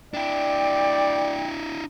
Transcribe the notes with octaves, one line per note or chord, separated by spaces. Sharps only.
D4 E4 D5 G5